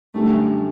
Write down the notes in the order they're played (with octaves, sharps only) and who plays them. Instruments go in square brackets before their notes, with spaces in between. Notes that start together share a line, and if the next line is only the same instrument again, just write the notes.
[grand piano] F#2 D3 G3 [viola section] A3